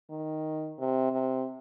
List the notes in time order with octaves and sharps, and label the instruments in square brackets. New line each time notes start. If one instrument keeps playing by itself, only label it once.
[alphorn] D#3
C3
C3